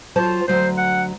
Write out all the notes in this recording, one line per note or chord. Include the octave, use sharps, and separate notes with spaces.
F#3 F4 C5 A5
D2 F#3 C5
F#5